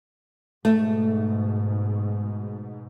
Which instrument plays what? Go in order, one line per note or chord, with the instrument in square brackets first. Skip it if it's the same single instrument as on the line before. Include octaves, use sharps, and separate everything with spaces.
[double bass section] G#2 B2 [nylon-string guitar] A3